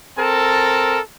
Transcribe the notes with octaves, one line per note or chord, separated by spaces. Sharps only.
C4 A4 A#4 A5